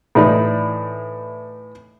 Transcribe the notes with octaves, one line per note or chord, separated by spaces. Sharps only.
A2 E3 D#4 D5